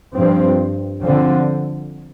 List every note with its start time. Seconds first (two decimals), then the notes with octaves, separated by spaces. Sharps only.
0.16 G2 F3 C4
1.03 D3 F3 C4